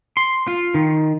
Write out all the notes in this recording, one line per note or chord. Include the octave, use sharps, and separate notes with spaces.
C6
F4
D#3